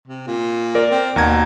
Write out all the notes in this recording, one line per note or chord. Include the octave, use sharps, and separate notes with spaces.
C3
A#2
A#4 D5
C4
D#2 B2 A#5 G#6